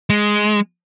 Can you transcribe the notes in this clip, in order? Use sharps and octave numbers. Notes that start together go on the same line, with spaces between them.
G#3